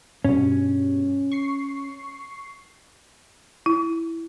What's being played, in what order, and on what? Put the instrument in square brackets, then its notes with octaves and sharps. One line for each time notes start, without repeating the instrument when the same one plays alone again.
[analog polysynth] G2 B2 [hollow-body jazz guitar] C#4
[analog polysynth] C#6 C7
[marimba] E4